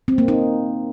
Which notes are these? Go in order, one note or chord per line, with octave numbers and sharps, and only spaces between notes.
C4
A#3
D#4